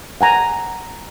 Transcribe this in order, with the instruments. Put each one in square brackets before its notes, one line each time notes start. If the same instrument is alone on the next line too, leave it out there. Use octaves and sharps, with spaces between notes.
[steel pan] F#5 G#5 A#5